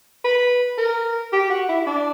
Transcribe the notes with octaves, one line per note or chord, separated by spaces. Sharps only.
B4
A#4
G4
F#4
E4
E4
D4